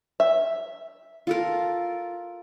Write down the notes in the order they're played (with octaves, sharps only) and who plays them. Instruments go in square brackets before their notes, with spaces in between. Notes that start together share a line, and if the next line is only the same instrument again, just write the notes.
[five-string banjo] E5
[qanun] F4 A4 A#4